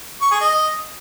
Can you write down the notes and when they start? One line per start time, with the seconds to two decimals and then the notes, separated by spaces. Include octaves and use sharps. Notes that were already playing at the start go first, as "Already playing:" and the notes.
0.22 C#6
0.31 G#4
0.41 D#5